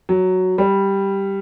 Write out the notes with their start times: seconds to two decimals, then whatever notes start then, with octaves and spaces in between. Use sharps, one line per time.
0.09 F#3
0.58 G3